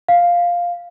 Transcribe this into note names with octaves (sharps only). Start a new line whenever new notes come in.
F5